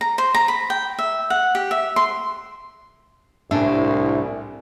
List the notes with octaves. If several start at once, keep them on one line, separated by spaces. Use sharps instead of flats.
A#5
C5
A#5
B5
G5
E5
F#5
G4
E5
C6
C2 A2 D4 E5 G#5